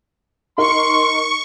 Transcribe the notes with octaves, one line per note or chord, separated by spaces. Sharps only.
D#4 A#4 C6 C#6